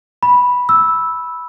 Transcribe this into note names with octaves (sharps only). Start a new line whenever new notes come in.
B5
E6